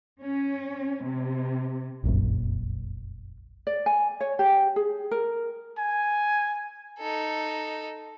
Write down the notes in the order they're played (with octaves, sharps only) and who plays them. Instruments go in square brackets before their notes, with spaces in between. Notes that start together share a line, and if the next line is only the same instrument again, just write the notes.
[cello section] C#4
C3
[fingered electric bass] F1 A#1 F#2
[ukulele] D5
G#5
C#5
G4
G#4
A#4
[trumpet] G#5
[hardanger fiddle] D#4 A4